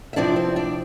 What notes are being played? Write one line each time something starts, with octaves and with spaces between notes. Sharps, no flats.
E5
C3 F3 C4 D4 E4 D5
C4 C5
D4 D5